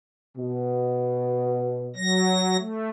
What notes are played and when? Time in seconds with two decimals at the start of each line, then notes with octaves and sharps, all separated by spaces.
0.37 B2
1.96 F#3 A#6
2.58 A3